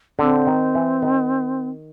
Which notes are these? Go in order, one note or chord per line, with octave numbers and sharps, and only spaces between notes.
D3 C4
D#3
E3
D#3